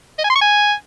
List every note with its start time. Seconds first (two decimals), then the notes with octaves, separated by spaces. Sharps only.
0.18 D#5
0.24 G#5
0.30 C6
0.36 C#6
0.41 G#5